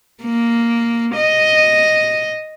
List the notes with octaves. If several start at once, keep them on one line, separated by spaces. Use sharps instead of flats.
A#3
D#5